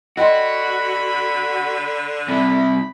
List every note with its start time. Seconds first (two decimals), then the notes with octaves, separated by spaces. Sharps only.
0.17 D3 F#4 D#5 G5 B5 C6
2.28 C2 C3 B5